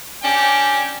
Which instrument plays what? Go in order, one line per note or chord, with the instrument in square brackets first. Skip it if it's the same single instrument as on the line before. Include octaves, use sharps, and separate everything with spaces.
[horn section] C#4 D4 G4 G5